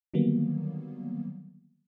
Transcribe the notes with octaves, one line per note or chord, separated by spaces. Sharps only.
D3 D#3 F#3 G3 A#3 B3